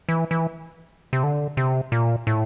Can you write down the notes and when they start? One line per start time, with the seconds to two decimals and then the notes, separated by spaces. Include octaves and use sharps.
0.09 E3
0.31 E3
1.13 C3
1.24 D3
1.57 C3
1.92 A#2
2.27 A2